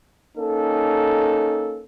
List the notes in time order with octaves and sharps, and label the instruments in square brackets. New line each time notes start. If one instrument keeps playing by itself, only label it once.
[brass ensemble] A#3 C#4 D#4 A4